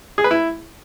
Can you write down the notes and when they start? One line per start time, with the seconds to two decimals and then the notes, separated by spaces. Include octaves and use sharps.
0.18 G#4
0.24 B4
0.31 E4